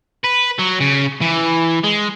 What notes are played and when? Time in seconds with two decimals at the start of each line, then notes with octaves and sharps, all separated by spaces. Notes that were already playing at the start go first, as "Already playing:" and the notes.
0.24 B4
0.59 F#3
0.81 C#3
1.21 E3
1.84 G#3